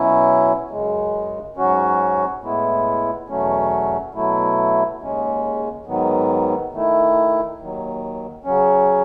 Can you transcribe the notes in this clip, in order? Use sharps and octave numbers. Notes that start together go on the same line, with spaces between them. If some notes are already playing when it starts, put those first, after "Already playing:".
Already playing: B2 F#3 C#4 E4
F#2 C#3 G#3
G#2 F#3 C#4 F#4
A2 G#3 B3 E4
E2 B2 F#3 A3 C#4
B2 F#3 A3 E4
D#2 C#3 G#3 C#4
G#2 D#3 F#3 B3
D#3 A3 E4
D#2 D#3 F#3
C#3 F#3 C#4